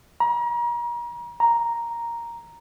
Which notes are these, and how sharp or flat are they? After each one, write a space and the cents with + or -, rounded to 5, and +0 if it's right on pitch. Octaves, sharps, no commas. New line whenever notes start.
A#5 +35
A#5 +0